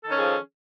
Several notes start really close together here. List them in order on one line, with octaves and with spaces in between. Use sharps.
A4 D#3 C#4 G#4 F3